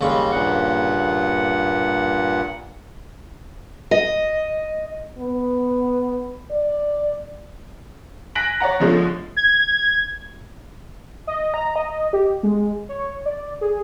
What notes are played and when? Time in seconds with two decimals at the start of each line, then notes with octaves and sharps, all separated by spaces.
0.01 D#2 C#3 G3 G#3 C#6
0.32 G2 A#2 F#5
3.91 D#5
5.18 B3
6.51 D5
8.35 G#5 F#6 A#6 B6 D7 F#7
8.60 C#5 D5 F#5 A#5
8.80 B2 D3 F3 G#3 A3 C#4
9.36 G#6
11.27 D#5
11.54 A#5
11.76 D#5
12.13 G4
12.43 G#3
12.89 C#5
13.26 D5
13.61 G#4